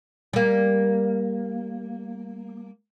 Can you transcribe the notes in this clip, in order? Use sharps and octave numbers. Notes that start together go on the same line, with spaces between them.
G3 A#3